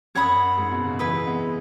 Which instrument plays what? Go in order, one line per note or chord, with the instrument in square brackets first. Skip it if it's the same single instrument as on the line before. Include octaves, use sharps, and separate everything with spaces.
[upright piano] F#2 [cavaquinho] C#5 F#5 B5 D#6
[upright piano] G#2
B2
C#3
[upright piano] E3 [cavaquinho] E4 B4 D#5
[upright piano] G#3
B3